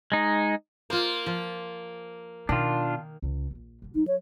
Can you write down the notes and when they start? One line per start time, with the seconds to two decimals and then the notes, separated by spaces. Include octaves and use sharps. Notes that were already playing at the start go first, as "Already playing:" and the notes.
0.12 G#3 D#4
0.90 A#3 F4 C5
1.26 F3 F4
2.49 B2 D#3 D4 F4
3.22 C#2 C#3
3.51 D#1 A#1
3.82 G2 D3
3.95 F#3 D#4
4.07 C#5